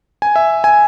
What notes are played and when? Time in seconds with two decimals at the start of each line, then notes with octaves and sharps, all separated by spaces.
0.22 G#5
0.36 E5
0.64 G#5